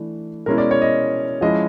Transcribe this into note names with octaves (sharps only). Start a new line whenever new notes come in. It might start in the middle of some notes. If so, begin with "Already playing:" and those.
Already playing: E3 A3 D4
B2 G#3 C#4 E4 A#4
D5
C#5
D#5
F3 G#3 C#4 E4 D#5